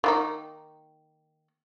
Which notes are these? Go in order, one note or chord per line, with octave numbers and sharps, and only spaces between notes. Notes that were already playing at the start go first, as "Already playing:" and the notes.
D#3 A#3 D#4